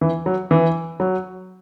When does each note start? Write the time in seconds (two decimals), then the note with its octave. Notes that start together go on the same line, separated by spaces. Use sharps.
0.01 E3
0.26 F#3
0.51 E3
1.00 F#3